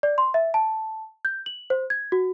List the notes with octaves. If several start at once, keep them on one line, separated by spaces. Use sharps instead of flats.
D5
C6
E5
A5
G6
F#7
C5
G#6
F#4